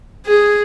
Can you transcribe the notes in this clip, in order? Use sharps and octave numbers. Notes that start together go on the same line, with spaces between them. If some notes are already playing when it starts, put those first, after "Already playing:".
G#4